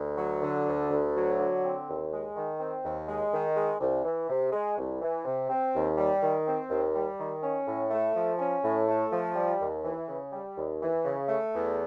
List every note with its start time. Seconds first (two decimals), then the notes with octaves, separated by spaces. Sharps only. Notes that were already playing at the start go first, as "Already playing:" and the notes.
Already playing: D2
0.18 F#3
0.42 D3
0.67 D2
0.90 D2
1.15 F#3
1.39 D3
1.64 C4
1.88 D#2
2.12 G#3
2.35 D#3
2.60 C4
2.84 D#2
3.08 G#3
3.33 D#3
3.56 G#3
3.80 C2
4.04 E3
4.29 C3
4.53 G#3
4.78 C2
5.02 E3
5.25 C3
5.50 C4
5.74 D#2
5.97 G3
6.22 D#3
6.46 C4
6.70 D#2
6.95 G3
7.19 D#3
7.43 C#4
7.67 A2
7.91 A3
8.15 F3
8.39 C#4
8.63 A2
8.88 A3
9.12 F3
9.35 G3
9.60 D#2
9.84 E3
10.08 C#3
10.33 G3
10.57 D#2
10.81 E3
11.05 C#3
11.29 A3
11.54 E2